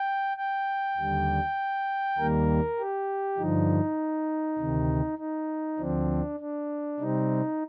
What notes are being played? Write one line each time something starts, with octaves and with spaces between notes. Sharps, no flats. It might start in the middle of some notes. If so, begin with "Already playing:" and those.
Already playing: G5
G5
D#2 D3 G3
D#2 D#3 G3 A#3 A#4
G4
G2 D3 F3 D#4
D2 C3 D#3
D#4
D2 D3 F3 C4 D4
D4
C3 G3 C4 D#4